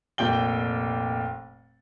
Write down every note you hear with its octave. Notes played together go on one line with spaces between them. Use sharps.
F1 A#2 G5 G7